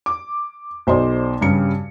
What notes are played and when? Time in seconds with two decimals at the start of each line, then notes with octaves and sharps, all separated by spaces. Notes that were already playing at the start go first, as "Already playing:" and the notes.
0.06 D6
0.87 B1 C5 D5 D#5 C6
1.41 G2 C#3 G3 C#7